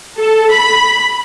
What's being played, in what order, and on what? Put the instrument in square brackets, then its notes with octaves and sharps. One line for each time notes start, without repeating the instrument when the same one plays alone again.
[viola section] A4
B5